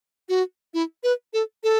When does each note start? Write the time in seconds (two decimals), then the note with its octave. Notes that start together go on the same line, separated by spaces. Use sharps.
0.29 F#4
0.74 E4
1.03 B4
1.33 A4
1.64 A4